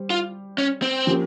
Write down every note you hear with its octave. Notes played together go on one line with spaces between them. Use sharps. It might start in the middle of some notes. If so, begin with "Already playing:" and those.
Already playing: G3 C5
F4
C#4
C4
F3 A#3 C#4 G4